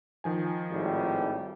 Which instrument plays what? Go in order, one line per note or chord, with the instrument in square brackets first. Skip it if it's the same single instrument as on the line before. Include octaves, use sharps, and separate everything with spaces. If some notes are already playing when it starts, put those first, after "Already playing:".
[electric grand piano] D#3 F3 G#5
[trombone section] G#1 A2 G3